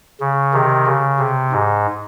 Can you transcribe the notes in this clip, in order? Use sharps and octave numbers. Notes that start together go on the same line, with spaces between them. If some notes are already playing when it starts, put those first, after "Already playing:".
C#3
C3 D#3
C#3
C3
G#2